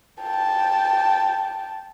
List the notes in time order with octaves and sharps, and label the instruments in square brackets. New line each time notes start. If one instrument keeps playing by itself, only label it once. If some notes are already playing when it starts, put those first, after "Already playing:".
[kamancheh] G5 A5